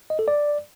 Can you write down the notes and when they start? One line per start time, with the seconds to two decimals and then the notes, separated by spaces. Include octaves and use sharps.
0.10 D#5
0.19 A4
0.28 D5